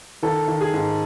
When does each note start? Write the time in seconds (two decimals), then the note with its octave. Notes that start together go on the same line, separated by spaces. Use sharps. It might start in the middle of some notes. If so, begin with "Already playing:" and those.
0.23 D#3 A4
0.48 D#3
0.61 G#4
0.74 G#2